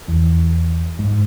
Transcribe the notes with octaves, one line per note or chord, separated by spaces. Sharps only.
E2
G#2